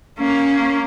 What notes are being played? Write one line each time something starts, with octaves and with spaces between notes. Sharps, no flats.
A#3 C#4